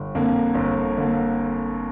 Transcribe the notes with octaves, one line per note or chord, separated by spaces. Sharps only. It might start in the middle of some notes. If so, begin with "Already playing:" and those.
Already playing: G1
F2 D3 A#3
G1
D3 A#3